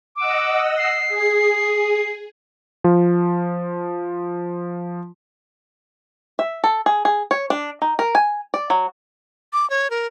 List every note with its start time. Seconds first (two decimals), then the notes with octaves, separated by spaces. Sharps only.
0.16 D#5 F#5 D6 E6
0.78 C7
1.08 G#4
2.84 F3 F4
6.39 E5
6.64 A4
6.86 G#4
7.05 G#4
7.31 C#5
7.50 D4
7.82 D#4
7.99 A#4
8.15 G#5
8.54 D5
8.70 F#3
9.53 D6
9.70 C#5
9.90 A#4